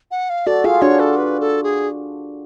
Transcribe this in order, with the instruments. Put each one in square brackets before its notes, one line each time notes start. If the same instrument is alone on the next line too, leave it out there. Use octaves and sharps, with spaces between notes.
[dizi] F#5
F5
[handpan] F#4 A4 [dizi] D5
[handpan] F4 G#4 [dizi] F5
[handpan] D4 F#4 [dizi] C#5
[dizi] A4
B4
A4
G#4